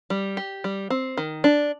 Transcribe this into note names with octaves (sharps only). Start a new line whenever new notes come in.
G3
G4
G3
C4
D#3
D4